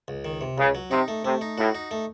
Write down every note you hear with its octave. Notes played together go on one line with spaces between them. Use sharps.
C#2
D#3
C3
C#2 C#3
F#3
C3 D#4
A3
C3 A3
D#4
A2 F#4
D#4
A3